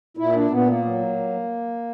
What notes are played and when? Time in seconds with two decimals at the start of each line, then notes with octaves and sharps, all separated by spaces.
0.17 A#2 E4
0.35 D4
0.51 A#2 B3
0.69 A#3
0.85 F#3